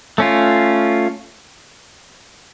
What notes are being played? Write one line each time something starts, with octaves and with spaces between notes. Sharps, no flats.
A3 C#4 F4